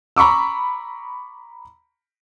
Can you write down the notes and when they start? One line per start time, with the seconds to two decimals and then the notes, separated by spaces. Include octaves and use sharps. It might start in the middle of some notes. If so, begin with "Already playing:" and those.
0.16 A#5 B5 C#6 D6 E6